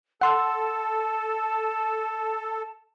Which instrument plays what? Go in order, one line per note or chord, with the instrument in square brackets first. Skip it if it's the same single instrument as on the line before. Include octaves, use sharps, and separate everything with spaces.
[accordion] A4 [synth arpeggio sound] F#5 C6 E6 [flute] A5